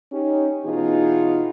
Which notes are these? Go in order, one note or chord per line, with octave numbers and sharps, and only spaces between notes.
C#4 D#4 G4
B2 E3 B3 D#4 F4 G#4